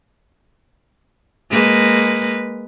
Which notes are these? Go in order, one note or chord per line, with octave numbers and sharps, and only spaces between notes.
G#3 A#3 B4